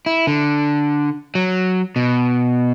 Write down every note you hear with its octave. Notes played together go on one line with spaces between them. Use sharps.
E4
D3
F#3
B2